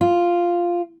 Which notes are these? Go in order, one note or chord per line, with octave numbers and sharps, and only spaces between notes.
F4